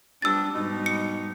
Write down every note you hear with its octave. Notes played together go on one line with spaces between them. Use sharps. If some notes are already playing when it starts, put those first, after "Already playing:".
F3 G3 B3 D4 G4 E6 A6
G#2 B2 G3 D#4
C#7